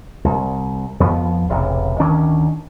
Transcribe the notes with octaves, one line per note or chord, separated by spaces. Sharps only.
C2
F2 F3 B3
E1 A1 C3
D2 D#3 C#4 D4